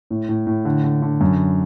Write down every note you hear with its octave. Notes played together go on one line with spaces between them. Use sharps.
A2
A2
A2
D3
D3
D3
F#2